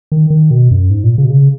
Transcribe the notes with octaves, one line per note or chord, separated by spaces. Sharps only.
D#3
D#3
B2
F#2
G#2
A#2
C#3
B2
C#3